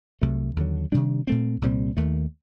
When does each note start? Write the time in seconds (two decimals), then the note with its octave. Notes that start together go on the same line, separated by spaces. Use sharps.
0.21 C2 C3 F#3 A3
0.56 D#2 D3 F#3
0.92 C3 D#3 G3 D4
1.27 A#2 A3 C4
1.62 C2 A#2 G3 C4
1.97 D#2 D#3 A3